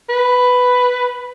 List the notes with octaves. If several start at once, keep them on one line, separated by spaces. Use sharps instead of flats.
B4